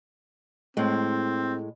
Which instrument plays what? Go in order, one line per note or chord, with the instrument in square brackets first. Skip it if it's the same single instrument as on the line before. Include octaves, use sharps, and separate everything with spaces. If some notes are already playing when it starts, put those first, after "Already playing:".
[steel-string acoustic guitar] A2 G#3 [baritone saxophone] C4